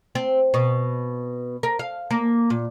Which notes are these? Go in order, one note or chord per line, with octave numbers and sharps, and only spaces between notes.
C4
B2
A#4
F5
A#3
A#2